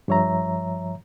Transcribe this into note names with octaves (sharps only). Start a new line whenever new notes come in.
G2 F3 C#5 E5 A#5